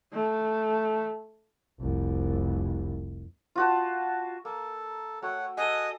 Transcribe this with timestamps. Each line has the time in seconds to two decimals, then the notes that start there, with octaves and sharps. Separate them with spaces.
0.13 A3
1.79 F1 C2
3.56 F4 F#4 A5
4.45 A#3 A4
5.22 A3 F#4 C#5 F#5 G5
5.57 G#4 A4 D#5 F#5 G#5